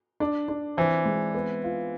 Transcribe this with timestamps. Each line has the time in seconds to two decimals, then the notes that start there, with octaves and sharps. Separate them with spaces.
0.20 D4
0.48 D4
0.77 E3 C4
1.06 G#3
1.34 B3
1.64 F4